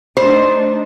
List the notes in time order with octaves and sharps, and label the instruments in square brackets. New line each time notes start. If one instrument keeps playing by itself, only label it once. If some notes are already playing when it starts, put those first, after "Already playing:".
[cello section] A3 D4 D#4 [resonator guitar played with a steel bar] C5